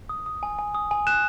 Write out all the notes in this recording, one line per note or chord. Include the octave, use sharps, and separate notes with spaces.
D#6
D#6
G#5
G#5
D#6
G#5
F#6 E7